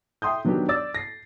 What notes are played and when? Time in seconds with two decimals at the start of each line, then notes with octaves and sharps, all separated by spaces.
0.22 E5 G5 C6 D#6 G6
0.44 D#3 F#3 B3 D4 G4
0.69 D5 D6 E6 A6
0.95 A#6 C7